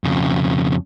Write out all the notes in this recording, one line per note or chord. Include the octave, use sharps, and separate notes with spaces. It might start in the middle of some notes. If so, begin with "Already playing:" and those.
F2 C#3